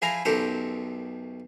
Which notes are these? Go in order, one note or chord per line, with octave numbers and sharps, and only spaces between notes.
F3 E4 G#4 F5 A#5
B1 F#2 G4 A4 A#4 C5